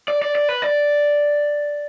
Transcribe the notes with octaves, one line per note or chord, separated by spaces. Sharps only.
D5
D5
D5
B4
D5